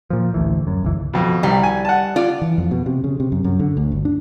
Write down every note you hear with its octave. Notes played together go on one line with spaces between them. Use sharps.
A#2 F3
A1 D2 E3
F#2
G1 C#2 E3
F2 B2
C2 G3
G#5
F#5 A5
F4 D5
E3
F2
B2
C3
C#3
C3
F#2
F#2
D3
D2
G1
D4